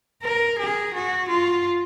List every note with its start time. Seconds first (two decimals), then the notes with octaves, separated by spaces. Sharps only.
0.23 A#4
0.58 G#4
0.94 F#4
1.29 F4